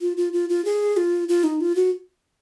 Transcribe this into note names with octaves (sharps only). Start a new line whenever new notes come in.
F4
F4
F4
F4
G#4
F4
F4
D#4
F4
F#4